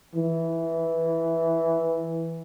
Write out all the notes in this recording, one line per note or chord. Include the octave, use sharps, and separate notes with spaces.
E3